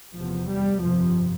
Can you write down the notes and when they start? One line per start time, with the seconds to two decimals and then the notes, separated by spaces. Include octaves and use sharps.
0.16 F1 E2 C3 F3
0.49 G3
0.81 G1 F2 C3 F3